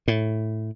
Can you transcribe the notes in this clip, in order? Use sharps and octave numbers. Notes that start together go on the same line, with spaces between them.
A2